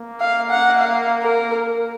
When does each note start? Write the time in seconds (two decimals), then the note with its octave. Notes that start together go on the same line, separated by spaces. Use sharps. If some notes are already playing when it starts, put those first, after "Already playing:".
Already playing: A#3
0.20 F5
0.50 F#5
0.79 F5
1.23 A#4